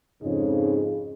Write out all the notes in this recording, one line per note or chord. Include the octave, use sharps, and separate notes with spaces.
F2 G#2 C#3 G#3